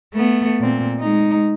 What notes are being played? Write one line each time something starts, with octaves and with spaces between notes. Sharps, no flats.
A3 B3
A#2 C4
G#3 D#4